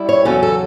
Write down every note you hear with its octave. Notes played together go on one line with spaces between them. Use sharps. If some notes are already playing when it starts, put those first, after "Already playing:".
Already playing: G3 E4
C#5
E2 C#3 F#3 C#4 A4
A4